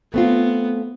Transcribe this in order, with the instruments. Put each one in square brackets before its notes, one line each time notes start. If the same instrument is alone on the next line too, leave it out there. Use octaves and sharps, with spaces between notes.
[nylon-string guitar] A3 C4 F4 [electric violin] B3